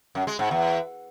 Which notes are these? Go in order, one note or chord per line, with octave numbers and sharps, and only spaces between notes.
F#2
G#3
G#2
E2